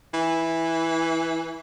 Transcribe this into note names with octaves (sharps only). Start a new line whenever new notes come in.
E3